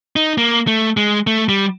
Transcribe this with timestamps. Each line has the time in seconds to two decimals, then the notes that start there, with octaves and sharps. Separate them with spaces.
0.16 D#4
0.38 A#3
0.67 A3
0.97 G#3
1.27 A3
1.49 G3